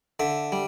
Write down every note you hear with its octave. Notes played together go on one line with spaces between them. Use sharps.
D3 E5
G3